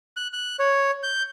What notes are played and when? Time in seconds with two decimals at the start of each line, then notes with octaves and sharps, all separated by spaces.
0.17 F#6
0.33 F#6
0.59 C#5
1.03 G6